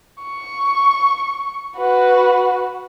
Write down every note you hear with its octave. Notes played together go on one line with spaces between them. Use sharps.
C#6
F#4 B4